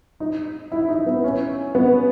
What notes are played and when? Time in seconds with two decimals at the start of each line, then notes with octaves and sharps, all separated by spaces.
0.20 D#4
0.72 E4
0.89 D#4
1.06 B3
1.24 C#4
1.75 B3